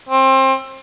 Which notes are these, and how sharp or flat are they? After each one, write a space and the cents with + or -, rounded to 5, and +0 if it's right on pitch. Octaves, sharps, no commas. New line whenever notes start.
C4 +25